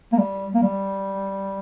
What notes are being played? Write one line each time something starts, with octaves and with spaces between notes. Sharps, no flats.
A#3
G3
A#3
G3